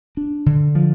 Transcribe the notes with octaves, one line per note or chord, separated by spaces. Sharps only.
D4
D3
F3